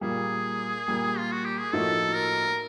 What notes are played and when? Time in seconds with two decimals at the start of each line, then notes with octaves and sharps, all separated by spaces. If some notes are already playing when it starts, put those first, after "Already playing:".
0.01 A#2 G3 A#3 G#4
0.88 A#2 G3 A#3
1.18 F4
1.31 F#4
1.45 G4
1.59 G#4
1.73 A2 F3 A#3 D#4 F#4 A4
2.16 A#4